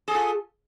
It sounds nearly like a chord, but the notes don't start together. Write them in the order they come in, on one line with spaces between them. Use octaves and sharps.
G#4 A4 F4